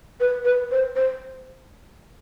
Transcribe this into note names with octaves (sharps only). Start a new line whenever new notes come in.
B4
B4
C5
C5